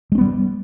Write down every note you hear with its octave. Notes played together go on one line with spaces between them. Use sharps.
G3 G#3 B3 C#4